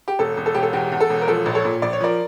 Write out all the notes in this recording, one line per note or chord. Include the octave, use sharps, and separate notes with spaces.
G4
E1 A4
E1
A4
E1 G4
A4
E2 G4
E2
A4
E1
A#4
F3 A4
A#1
A4 C#5
A#2
A#1 D5
C#5
F3 A#4 D5